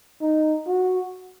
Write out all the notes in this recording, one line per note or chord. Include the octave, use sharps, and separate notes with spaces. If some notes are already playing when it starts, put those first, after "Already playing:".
D#4
F#4